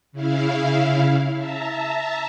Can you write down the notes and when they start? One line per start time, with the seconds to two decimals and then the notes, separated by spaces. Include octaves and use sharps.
0.12 C#3 E4 F5
1.35 E5 A5 A#5